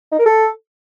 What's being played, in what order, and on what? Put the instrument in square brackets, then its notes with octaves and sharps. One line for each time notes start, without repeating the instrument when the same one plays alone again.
[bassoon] D#4
A#4
A4